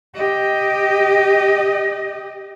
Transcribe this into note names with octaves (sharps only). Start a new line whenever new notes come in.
G4 D#5